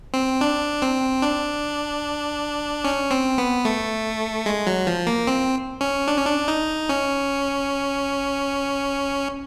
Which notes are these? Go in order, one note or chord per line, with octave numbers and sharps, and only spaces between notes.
C4
D4
C4
D4
C#4
C4
B3
A3
G#3
F#3
F3
A#3
C4
C#4
D4
C#4
D4
D#4
C#4